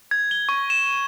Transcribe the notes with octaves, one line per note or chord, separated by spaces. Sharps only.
G#6
G7
C#6
E7